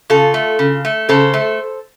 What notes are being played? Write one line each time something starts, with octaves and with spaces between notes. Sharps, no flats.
C#3 F4 A4
A3
C#3
A3
C#3 A4 C5
A3